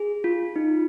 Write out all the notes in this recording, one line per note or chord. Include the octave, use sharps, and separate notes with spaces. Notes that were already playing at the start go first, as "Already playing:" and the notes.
Already playing: G#4
F4
D#4